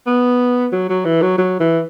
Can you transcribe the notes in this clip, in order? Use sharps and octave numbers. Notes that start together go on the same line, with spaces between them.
B3
F#3
F#3
E3
F#3
F#3
E3